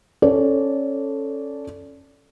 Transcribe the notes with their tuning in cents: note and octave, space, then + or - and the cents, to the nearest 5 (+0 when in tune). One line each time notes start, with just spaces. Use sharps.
C#4 -15 A4 +0 D5 -20